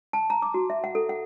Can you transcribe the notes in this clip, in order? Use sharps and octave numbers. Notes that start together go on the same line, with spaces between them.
A5
A#5
D6
F#4
E5
F#5
A4
F#5